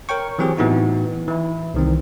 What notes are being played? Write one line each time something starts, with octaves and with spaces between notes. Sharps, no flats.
A#4 C#5 G5 C#6
E3 F#3 C4 G4 G#4
A2 E3 B3 D#4 F#4
E3 E4
C2 D#3 C4